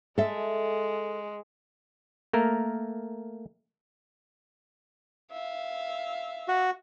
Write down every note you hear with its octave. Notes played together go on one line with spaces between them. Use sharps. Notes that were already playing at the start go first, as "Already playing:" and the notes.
G#3 A4 E5
A3 A#3 A#4
E5 F5
F#4